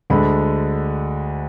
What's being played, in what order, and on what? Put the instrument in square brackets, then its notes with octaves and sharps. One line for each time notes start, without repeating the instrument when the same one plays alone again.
[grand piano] D2 D3 G#3 B5